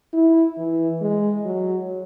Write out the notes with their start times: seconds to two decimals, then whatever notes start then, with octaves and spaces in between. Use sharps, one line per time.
0.13 E4
0.57 E3
1.02 G#3
1.45 F#3